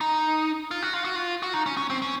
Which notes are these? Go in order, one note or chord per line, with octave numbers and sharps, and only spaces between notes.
D#4
F4
F#4
F4
F#4
F4
F#4
D#4
C#4
C#4
C4
C#4